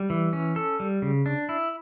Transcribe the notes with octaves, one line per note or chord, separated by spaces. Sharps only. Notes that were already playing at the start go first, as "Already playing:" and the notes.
Already playing: G3
E3
C#4
A4
G3
C#3
D4
E4